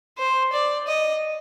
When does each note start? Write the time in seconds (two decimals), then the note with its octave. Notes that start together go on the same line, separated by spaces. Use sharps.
0.18 C5
0.53 D5
0.87 D#5